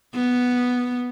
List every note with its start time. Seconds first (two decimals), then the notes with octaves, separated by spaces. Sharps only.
0.15 B3